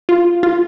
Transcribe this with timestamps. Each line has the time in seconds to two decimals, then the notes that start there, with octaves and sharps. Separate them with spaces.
0.09 F4
0.43 F4